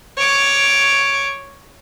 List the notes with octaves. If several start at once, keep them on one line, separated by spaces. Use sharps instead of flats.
C#5 D6